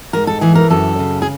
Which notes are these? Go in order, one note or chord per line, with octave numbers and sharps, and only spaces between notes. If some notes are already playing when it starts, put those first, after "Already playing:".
G#2 A#4
A4
E3 G#4
A#4
F#2 A4
C#3
G#4